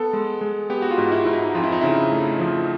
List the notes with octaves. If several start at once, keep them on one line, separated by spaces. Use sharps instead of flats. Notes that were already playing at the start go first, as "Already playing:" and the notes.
Already playing: B3 A4
G#3
G#3
B3 G4
F#4
F4
G#2
E4
G#2 E4
D#4
F2 F4
E4
D#4
C#3 E4
A3
F3